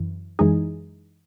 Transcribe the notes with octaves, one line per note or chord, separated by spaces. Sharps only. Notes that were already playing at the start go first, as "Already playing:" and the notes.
Already playing: F#2 E3
F#2 E3 G#3 D#4 G#4